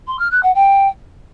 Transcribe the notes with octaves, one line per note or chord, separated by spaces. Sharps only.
C6
F6
F#6
F#5
G5